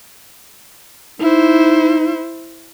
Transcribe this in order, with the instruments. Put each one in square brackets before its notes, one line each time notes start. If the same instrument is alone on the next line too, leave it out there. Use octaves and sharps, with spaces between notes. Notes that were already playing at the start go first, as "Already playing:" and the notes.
[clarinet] D#4 [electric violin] E4 C5